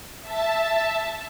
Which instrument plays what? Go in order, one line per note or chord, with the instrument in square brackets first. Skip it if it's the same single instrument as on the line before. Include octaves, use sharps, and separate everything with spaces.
[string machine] E5 A5